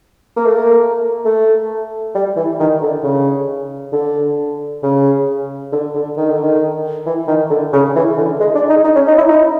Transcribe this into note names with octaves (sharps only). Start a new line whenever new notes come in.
A#3
A3
A#3
A3
G3
E3
D#3
D3
C#3
D3
C#3
D3
D3
D#3
D3
D#3
E3
D#3
D3
C#3
E3
D3
G#3
D4
D#4
D#4
C#4
D#4
E4
D#4